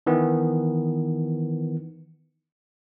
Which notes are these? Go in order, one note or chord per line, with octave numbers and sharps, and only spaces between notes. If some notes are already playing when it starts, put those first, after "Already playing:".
D#3 E3 B3